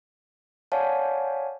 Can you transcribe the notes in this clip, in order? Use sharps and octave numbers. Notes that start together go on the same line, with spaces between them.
C#5 D5 F5 F#5 G#5 A5